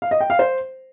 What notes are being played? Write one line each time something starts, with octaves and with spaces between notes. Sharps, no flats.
F5
D#5
G5
F5
C5